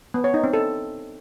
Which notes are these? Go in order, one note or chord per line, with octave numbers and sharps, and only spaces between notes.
B3
C#5
D#4
C4
A4